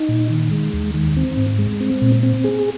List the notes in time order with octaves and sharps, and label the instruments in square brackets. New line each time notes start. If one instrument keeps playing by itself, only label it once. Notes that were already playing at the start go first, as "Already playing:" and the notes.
Already playing: [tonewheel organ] D#4
A#2
D#3
G#3
D#2
D#3
C4
G#2
G#3
C4
A#2
C4
G#4